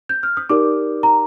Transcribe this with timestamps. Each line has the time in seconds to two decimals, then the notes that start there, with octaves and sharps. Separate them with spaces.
0.09 G6
0.23 F6
0.37 D#6
0.49 D#4 G4 A#4 D5 D6
1.03 A#5